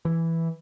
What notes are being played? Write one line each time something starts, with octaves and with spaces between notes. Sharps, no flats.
E3